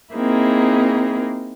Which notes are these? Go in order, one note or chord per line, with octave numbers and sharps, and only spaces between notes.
A#3 C4 D#4 E4 G#4